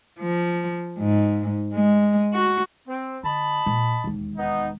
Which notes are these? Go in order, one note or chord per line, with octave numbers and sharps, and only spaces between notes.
F3
G#2
G#3
F#4
C4
D3 D#5 A5 B5
A#2
E1 D#2
B3 D#4